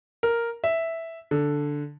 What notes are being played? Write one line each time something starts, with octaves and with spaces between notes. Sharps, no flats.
A#4
E5
D3